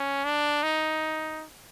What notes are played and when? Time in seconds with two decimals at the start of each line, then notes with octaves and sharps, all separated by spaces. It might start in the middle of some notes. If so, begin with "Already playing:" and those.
Already playing: C#4
0.24 D4
0.63 D#4